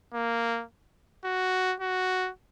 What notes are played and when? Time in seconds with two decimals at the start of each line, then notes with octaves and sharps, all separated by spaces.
0.14 A#3
1.25 F#4
1.80 F#4